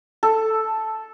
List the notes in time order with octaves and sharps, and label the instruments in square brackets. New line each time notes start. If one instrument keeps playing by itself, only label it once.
[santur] A4